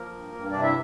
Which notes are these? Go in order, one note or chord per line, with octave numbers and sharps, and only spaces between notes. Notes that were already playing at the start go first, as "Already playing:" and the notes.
Already playing: F3 A#3 A#4
G2
G2
C3 D4 D5
E4 E5